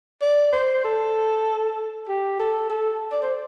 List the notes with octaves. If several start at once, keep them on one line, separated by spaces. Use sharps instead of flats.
D5
C5
A4
G4
A4
A4
D5
C5